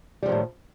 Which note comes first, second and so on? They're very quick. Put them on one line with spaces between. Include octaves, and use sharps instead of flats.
G3 F3 D#3 A2